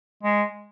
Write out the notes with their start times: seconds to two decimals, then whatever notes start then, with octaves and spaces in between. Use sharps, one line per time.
0.23 G#3